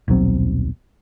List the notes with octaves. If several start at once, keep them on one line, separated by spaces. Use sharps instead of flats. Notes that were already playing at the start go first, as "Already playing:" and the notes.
D#1 B1 F#3 C4